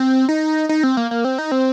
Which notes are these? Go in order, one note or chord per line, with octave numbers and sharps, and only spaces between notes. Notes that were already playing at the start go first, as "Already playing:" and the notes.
Already playing: C4
D#4
D#4
C4
A#3
A#3
C4
D#4
C4